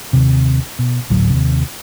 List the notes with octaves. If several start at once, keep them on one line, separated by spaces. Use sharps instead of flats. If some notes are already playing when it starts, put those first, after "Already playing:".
D#2 C3
B2
G#1 D2 A2 F#3
D#2 C3